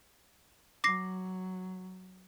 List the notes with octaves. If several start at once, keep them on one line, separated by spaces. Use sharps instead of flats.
F#3 D6 A#6 C7